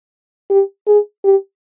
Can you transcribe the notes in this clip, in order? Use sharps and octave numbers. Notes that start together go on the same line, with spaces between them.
G4
G#4
G4